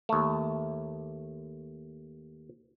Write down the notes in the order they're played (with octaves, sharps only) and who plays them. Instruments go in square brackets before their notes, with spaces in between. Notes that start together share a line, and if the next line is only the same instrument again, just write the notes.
[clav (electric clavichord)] D#2 A3